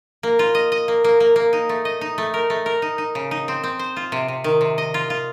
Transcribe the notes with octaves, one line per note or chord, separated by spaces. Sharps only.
A#3
F4
D#5
D#5
A#3
A#3
A#3
A#3
D#4
A3
D#5
D#4
A3
A#4
A3
A#4
D#4
D#4
C#3
D#4
C4
C4
C5
F4
C3
C3
D#3
C3
D#5
F4
F4